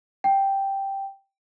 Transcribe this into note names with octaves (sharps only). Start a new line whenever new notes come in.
G5